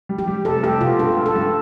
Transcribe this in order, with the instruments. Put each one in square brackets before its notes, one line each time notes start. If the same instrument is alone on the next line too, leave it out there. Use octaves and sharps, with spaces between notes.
[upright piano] G3
[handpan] G4
[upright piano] G3
[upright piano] F1 [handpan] A4
[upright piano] F1 [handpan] G4
[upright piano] B2 [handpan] F4
[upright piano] G2 [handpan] A4
[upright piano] G2
[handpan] A4
[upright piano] G2